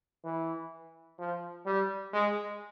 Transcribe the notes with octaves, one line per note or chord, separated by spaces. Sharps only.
E3
F3
G3
G#3